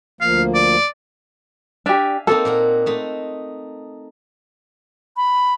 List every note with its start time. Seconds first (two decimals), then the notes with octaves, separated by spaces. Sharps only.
0.21 D2 F3 A#3 F5
0.54 D5
1.86 D4 G4 E5 F5 G#5
2.27 A#3 C4 D#4 A4
2.45 A#2 A#4 F#5
2.86 A3 D#4
5.17 B5